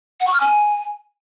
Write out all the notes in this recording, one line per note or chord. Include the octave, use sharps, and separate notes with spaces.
F#5
C#6
F6
G#5